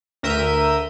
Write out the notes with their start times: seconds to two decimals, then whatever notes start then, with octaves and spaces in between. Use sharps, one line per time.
0.23 D2 A#4 E5 G6 D#7